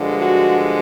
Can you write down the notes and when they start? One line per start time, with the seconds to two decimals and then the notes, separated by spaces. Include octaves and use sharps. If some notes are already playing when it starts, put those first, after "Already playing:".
Already playing: G2 D3 F3 G#3
0.21 F#4